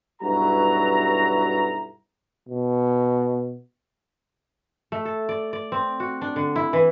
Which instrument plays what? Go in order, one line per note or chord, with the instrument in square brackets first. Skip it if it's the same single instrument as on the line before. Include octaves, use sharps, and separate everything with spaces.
[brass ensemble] B1 G2 F#3 E4 F#4 A#5
[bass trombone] B2
[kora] A3
A4
D5
D5
C4
F#4
D4
D3
E4
E3